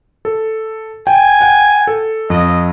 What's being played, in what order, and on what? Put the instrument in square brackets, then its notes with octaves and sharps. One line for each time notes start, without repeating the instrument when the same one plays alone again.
[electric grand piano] A4
[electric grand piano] G5 [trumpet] G#5
[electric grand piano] F#5 G5
A4
[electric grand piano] F2 [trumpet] D#5